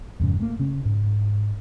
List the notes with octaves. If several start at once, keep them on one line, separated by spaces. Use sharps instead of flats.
F2 G#2 C#3
A3 A#3
C#3 C#4
G#2